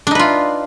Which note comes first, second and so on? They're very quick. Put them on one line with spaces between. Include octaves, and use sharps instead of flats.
D4 D#4 B4 F4